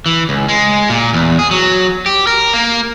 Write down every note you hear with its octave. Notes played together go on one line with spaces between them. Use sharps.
E3
C#2
G#3
A#2
E2
G#4
F#3
G4
A#4
A#3